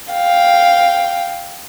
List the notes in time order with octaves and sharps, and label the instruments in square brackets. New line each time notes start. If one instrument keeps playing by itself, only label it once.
[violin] F5 G5